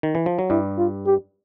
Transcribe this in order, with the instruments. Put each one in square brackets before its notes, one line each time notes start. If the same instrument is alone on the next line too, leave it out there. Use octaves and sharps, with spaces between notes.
[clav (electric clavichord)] D#3
E3
F3
F#3
[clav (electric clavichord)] G2 G3 [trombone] E4
[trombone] F4
G4